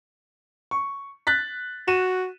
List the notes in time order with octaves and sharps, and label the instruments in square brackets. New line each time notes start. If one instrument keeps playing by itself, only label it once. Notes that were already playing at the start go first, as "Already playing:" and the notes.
[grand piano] C#6
F#6 A6 B6
[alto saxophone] F#4 [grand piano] D#7 E7